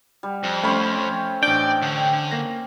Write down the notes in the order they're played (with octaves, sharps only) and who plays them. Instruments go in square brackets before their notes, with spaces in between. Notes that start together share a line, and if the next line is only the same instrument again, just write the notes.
[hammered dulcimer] G3
[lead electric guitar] F2
[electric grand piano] A3 B5 [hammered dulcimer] C4 C#4
[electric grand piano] A1 D4 [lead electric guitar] D5 [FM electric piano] G5
[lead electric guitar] D3
[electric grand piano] A#3 A#6